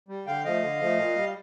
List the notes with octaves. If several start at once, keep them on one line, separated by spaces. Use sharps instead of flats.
G3
D3 F5 G5
F3 A3 D#5 F5
D3
F3 A3
A#2
G3